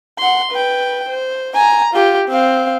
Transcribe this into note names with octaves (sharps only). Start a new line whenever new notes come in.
F#5 C6
B4 G5
C5
G#5 A#5
F4 G4
C4 F5